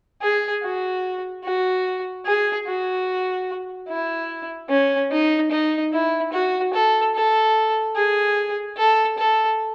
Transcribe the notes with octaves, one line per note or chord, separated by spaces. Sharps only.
G#4
F#4
F#4
G#4
F#4
E4
C#4
D#4
D#4
E4
F#4
A4
A4
G#4
A4
A4